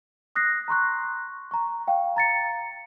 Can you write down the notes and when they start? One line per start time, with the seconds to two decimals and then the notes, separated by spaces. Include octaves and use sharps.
0.36 D#6 F#6 A#6 C7
0.68 A#5 C6 C#6 F#6
1.51 A#5 C#6
1.88 F5 G5
2.16 A#5 A6 C#7